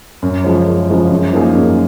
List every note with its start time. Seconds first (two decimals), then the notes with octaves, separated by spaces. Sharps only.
0.22 F#2
0.44 C#3 F3 G#3 C#4
0.67 F#2
0.89 C#3 F3 G#3 C#4
1.11 F#2
1.32 F3 A#3 D#4 G#4
1.55 F#2